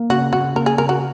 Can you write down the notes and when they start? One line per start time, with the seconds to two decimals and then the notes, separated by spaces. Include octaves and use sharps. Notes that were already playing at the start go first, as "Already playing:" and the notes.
Already playing: A#3
0.10 C#3 F#4
0.32 C#3 F#4
0.55 A#3 A#4
0.66 G#4
0.78 C#3 A#4
0.89 F#4